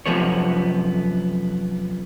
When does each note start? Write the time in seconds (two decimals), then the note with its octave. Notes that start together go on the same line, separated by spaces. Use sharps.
0.06 F#2 C3 F3 A3 B3 C#5